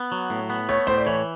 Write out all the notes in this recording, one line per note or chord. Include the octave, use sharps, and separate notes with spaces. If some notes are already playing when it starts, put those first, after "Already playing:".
Already playing: B3
F#3
A2
B3
A3 C#5
A2 C5
D5
E3 C#5